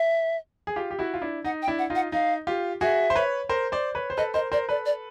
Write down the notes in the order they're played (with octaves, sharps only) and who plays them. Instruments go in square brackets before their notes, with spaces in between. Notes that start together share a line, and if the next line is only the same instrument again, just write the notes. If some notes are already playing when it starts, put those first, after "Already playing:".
Already playing: [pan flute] E5
[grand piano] G#4
F4 G4
G4
E4 F#4
F4
D4 E4
[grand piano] D#4 [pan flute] F#5
[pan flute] G5
[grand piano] D4 E4
[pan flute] F#5
[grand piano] D#4 F4
[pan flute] F#5
[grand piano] D#4 [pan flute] F5
[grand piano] F4 G4
[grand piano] F#4 G#4 [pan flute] E5
[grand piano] C5
B4 C#5
A#4 C5
C5 D5
B4 C#5
C5
[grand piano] A4 B4 [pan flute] D#5
[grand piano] A#4 C5 [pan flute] D#5
[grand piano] A#4 C5 [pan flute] D5
[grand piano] A4 B4 [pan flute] D5
[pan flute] D5